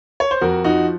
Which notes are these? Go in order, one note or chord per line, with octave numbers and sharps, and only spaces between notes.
C#5
C5
F2 F#4 A#4
F3 D#4 F#4